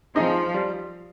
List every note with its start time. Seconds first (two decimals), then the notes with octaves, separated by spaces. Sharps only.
0.15 F3 C4 D#4 G#4 D#5
0.54 G3